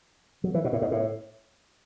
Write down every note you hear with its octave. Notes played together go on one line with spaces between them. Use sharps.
F#3
E3
B2
A2
G#2
A2